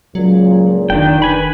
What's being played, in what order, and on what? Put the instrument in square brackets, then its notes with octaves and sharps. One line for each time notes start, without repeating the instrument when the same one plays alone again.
[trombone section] C#2 A#2 [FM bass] F#3
[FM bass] F1 [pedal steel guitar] D#3 D4 G5
[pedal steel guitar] B4 G#5 B5